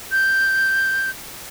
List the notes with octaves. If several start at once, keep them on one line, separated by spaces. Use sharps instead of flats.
G6